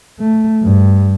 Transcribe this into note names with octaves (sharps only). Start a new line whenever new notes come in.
A3
G2